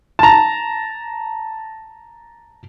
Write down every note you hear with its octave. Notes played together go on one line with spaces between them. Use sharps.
A5 A#5